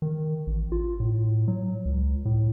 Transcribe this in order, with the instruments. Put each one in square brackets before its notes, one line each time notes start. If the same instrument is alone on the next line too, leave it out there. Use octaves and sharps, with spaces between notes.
[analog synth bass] D#3
A1
F4
A2
F#3
C#2
A2